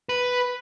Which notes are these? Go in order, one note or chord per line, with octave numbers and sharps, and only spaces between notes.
B4